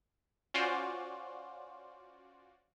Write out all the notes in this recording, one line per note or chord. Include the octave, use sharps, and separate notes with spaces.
C#4 F4 F#4 C5 D5